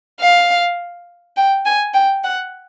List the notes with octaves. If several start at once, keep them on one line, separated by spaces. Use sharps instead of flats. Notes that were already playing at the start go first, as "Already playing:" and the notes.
F5
G5
G#5
G5
F#5